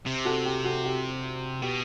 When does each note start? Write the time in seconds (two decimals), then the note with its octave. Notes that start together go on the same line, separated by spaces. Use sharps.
0.06 C3
0.25 F#4 A4
0.45 G4
0.64 F#4 A4
0.85 G4
1.62 B2 G4